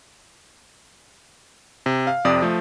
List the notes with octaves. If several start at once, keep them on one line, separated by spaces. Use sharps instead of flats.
C3
F5
F2 C3 D5 D#6
F3 A3